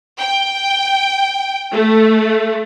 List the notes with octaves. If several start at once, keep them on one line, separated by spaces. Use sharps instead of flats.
G5
A3